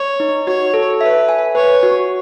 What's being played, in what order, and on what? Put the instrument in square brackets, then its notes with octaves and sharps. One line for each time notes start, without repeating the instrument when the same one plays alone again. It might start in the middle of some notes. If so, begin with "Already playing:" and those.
Already playing: [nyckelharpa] C#5
[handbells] D#4
[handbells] F#4 [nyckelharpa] C#5
[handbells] A4
[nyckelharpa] B4 [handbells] E5
[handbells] G#5
[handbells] B4 [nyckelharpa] C#5
[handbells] F#4